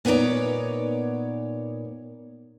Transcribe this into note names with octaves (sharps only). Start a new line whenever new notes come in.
A#2 B3 D#4 A#4 C#5 D5